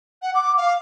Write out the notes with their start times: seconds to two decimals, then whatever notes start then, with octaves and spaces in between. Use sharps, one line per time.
0.22 F#5
0.35 D6
0.57 F5